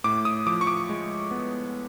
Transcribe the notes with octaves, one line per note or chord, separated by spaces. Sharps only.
A2 D6
D#6
F3 D6
C#6
D6
G#3
B3